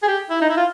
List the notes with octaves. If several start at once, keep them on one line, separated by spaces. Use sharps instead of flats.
G#4
G4
E4
D#4
E4
F4